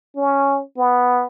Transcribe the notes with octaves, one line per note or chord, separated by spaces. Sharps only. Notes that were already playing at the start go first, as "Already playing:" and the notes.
C#4
B3